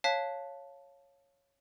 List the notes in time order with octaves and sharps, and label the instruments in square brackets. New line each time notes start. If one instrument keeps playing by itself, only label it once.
[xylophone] C#5 F5 A5 F#6 B6